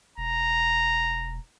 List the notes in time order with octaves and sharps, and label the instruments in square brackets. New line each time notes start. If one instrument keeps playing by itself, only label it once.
[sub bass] E1 [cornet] A#5